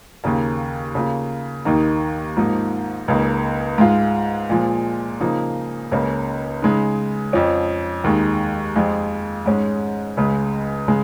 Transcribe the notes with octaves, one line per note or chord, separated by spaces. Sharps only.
D#2 C#3 A#3
C#3 A#3 F4
D#2 D#3 A#3 D#4
G#2 F3 A#3 D#4
C#2 C#3 A#3 D#4
G#2 G#3 F4
A#2 F3 G#3
C#3 F3 A#3 D#4
C#2 C#3 A#3 C#4
C#3 G#3 D#4
F2 F3 C#4
D#2 D#3 G#3
F2 F3 G#3 F4
G#2 G#3 C#4
C#2 C#3 G#3
C#3 G#3